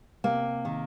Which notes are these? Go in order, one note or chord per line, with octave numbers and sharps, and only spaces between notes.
C3 A#3
D#3